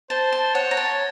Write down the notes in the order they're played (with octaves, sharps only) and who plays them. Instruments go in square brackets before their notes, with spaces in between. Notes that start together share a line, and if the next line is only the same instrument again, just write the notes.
[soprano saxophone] C5 [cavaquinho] A5
[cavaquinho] A5
[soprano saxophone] C#5 [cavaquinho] F#5
[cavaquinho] A#5
A5